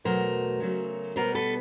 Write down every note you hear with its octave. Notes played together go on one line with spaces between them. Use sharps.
E2 B2 F#3 A3 A#4 C5
C#3 F#3 A3
B2 G3 B3 A#4 C5
A4 B4